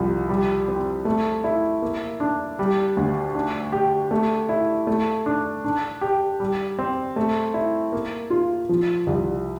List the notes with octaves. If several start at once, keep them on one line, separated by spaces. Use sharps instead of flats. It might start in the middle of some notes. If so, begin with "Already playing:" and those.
Already playing: C2 F3
G3
C4
A3
E4
A#3
D4
G3
D2
D4
G4
A3
E4
A3
D4
D4
G4
G3
C4
A3
E4
A#3
F4
F3
C2